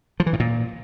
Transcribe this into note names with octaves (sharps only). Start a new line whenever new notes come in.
F3
E3
A2
A#2